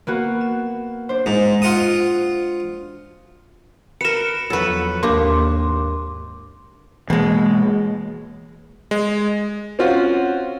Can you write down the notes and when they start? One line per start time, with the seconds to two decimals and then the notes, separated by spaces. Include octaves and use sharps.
0.07 A#3 B3 F#4
0.41 E7
1.09 D4 C5
1.26 G#2 G#3
1.62 F4 F#5 D#6
4.01 A#4 B4 C#7 E7
4.50 E2 F3 F#3 F#4 A4 B4
5.03 G#1 D#2 A#3 D4 G4 C6 D6
7.10 B2 E3 G#3 A#3
8.91 G#3
9.79 C4 C#4 F4 F#4